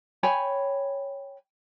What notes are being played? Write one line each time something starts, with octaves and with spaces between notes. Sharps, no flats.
C#5 G5 G#5 B5